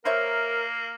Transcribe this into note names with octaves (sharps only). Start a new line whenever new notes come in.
A#3 A#4 C5 C#5 E5